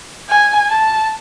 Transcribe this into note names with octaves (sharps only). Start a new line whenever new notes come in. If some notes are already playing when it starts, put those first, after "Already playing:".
G#5
A5